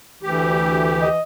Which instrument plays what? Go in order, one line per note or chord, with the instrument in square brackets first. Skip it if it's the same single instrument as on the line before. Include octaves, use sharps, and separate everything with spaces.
[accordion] D2 G4 [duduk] E3
[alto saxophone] D#5